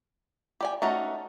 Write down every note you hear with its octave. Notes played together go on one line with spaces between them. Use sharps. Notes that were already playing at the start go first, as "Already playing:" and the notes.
G4 D5 G#5
A3 C#4 D#4 F#4